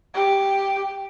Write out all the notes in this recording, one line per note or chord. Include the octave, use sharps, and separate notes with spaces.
G4